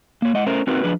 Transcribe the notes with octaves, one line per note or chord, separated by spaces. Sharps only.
A#3 C#5
G#3 D#5 F#5
A3 C#4 A#4 C5
C4 D#4 F#4 A#4 B4
F3 D4 G#4 B4